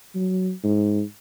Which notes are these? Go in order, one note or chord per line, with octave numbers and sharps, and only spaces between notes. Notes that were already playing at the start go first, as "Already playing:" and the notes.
F#3
G#2